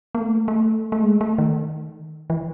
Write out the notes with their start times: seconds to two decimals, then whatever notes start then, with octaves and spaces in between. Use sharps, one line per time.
0.15 A#3
0.20 A3
0.48 A3
0.92 A3
1.03 G#3
1.21 A3
1.38 D#3
2.30 E3